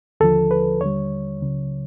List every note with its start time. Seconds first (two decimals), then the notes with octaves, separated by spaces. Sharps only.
0.20 D#2 D3 F3 A4
0.51 B4
0.81 D#2 D3 G3 C#5
1.41 C#2 C#3 F#3